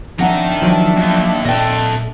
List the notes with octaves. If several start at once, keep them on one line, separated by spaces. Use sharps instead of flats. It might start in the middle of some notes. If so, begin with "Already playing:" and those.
F2 D#3 D4 E5 F#5 A#5
F3 F#3
D#2
A#2 A4 D#5 G5